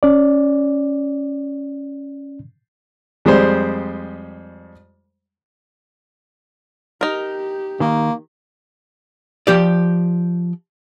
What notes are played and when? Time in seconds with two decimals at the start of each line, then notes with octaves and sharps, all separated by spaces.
0.03 C#4 D5
3.25 F2 G3 G#3 C5
7.01 D#4 G4 A#4
7.80 D#3 A#3
9.47 F3 G4 D5